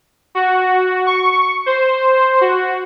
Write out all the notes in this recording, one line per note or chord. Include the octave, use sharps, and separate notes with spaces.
F#4
C#6
C5
F#4